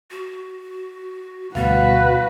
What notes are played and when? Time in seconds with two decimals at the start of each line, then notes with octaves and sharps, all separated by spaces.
0.11 F#4
1.55 D2 B2 G3 F#4 B4 F5